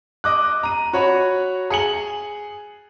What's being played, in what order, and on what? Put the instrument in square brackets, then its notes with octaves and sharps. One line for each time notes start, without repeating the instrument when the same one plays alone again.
[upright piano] D#5 D6 F#6
A#5 D#7
F#4 C#5 B5
G#4 C#7 F#7